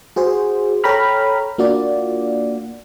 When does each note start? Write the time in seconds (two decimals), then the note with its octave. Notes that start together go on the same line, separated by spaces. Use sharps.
0.16 F#4 G#4 C5
0.84 A4 C#5 G5 A#5 B5 F6
1.58 A#3 D4 F4 F#4 D5